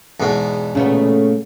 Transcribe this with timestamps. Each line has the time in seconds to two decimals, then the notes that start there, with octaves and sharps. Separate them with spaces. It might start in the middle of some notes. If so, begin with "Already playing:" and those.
0.20 E2 G#2 B2
0.75 A#2 C#3 A3 B3